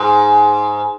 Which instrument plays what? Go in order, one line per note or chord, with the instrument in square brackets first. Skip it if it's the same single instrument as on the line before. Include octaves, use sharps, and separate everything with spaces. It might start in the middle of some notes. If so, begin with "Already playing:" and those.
Already playing: [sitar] G#2